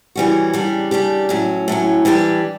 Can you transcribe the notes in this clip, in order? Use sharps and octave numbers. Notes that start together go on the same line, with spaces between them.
C#3 E3 G3 C#4 F#4
C#3 G3 D4 G4
C#3 G3 D4 G4
A2 F#3 C#4
A2 F#3 C#4
E3 G3 D4 G4